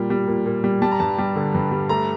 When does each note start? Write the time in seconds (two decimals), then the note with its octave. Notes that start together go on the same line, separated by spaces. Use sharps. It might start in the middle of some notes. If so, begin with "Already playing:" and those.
Already playing: A#2 G3
0.10 G3
0.27 A#2
0.46 A#2
0.64 G3
0.82 G3 A5
0.91 A#5
1.00 G2 A5
1.18 G3
1.36 D3
1.54 G2
1.71 G3
1.89 A3 A#5